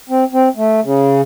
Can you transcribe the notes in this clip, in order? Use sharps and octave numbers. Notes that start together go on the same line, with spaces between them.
C4
C4
A3
C#3